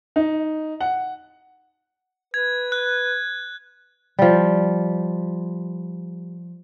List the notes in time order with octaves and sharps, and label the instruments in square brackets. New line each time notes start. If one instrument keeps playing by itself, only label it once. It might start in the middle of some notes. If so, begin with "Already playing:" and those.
[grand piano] D#4
F#5
[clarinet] B4 [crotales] G#6
[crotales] F#6
[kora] F3 G3